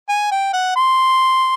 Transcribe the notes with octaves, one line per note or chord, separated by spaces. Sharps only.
G#5
G5
F#5
C6